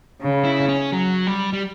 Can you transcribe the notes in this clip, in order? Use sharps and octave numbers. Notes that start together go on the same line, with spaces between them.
C#3
E4
C#4
F#3
G3
G3